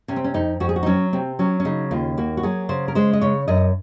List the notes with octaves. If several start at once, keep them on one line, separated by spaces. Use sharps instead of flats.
C3 C#4
C4
C#4
F2 D#4
F2 F#4
G#4
F#4
D#4
F#3 C#4
C3 C4
F#3 C#4
C#4
C#3 D#4
D#2 F4
A#3 F#4
F#4
F#3 G#4
C#3 C5
A#4
G#3 C5
D#5
C#3 C#5
F#2 D#5